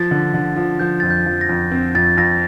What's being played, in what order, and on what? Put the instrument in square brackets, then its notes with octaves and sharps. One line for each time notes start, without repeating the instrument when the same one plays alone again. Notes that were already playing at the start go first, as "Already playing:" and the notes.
Already playing: [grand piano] F3 [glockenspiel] A6
[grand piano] D3
D3
F3
[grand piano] F3 [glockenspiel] G6
[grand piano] F2 [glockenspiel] A6
[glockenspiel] G6
[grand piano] F3
[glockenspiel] A#6
[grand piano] F2
C4
[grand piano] F2 [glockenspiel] A6
[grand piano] F2 [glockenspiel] A#6